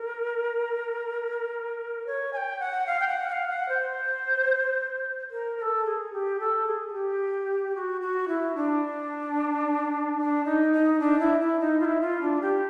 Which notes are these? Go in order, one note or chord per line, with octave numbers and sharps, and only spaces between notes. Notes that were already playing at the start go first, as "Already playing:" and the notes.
Already playing: A#4
C#5
G#5
G5
F#5
F5
G5
F#5
F#5
F5
F#5
C5
A#4
A#4
A4
G#4
G4
A4
G#4
G#4
G4
F#4
F#4
E4
D4
D4
D#4
D#4
D4
E4
E4
D#4
F4
E4
F4
D4
G4